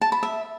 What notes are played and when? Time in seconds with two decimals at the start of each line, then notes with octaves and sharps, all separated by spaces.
0.01 A5
0.12 B5
0.23 E5